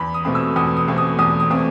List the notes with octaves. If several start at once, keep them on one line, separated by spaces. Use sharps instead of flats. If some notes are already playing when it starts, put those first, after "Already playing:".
Already playing: E2 B5
D#6
B2 A3 C4
E6
E2 D#6
D#6
B2 A3 C4
D#6
E2 D#6
D#6
B2 A3 C4